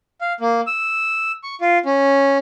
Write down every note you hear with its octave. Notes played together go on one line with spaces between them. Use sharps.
F5
A#3
E6
C#6
F4
C#4